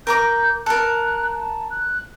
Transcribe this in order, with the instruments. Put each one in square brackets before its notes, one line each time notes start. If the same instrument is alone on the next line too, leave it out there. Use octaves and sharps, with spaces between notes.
[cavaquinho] A#4 A#5 D6 [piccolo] G6
[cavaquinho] A4 A#4 [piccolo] F#6
[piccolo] A5
F#6